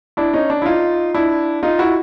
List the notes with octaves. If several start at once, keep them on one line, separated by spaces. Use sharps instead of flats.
D4 E4
C#4 D#4
D4
E4
D#4 F4
D4 E4
D#4 F4
E4 F#4